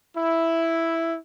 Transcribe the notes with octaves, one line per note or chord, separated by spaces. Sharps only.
E4